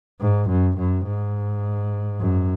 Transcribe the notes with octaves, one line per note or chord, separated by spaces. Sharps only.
G#2
F#2
F#2
G#2
F#2